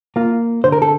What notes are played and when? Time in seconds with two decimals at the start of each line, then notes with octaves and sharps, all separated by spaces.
0.16 A#3 F4
0.64 D3 C5
0.72 A#4
0.82 A4